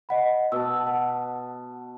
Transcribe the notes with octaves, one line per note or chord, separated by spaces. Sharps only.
D#5 F#5 B5
B2 A5 E6
F#5